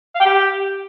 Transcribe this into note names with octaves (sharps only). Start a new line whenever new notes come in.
F5
G5
G4